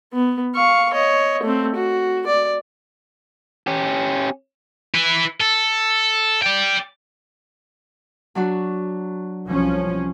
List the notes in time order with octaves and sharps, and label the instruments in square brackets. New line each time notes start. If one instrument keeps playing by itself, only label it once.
[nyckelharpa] B3
F5 C#6
C#5 D#5
A3 C4
F#4
D5
[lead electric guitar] C#4 G4
[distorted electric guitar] E4 B4
A4
D5 G5
[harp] F#3 D4 F#4
[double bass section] C2 F3 C#4